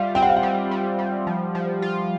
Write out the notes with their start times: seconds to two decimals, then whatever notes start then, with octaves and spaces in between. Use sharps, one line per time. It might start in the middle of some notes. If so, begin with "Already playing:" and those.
Already playing: G3 F4 E5 F5
0.15 C4 G5
0.22 F#5
0.30 F5
0.37 F#5
0.43 G3
0.71 G3
0.99 G3
1.27 F3
1.55 F3
1.82 F4